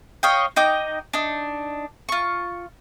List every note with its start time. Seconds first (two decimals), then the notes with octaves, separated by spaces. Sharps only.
0.23 C#5 D#5 F5 G5
0.56 D#4 D#5 G5 D6
1.13 D4 D#4
2.09 F4 C#6